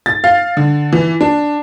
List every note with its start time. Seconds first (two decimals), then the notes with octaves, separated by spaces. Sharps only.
0.06 A6
0.24 F5
0.57 D3
0.93 E3
1.21 D4